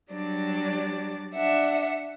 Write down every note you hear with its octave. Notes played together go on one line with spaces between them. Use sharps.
F#3 G3 D4 D5
D4 E5 F#5